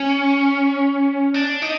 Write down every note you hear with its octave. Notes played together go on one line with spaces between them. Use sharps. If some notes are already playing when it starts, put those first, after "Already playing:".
Already playing: C#4
D4
D#4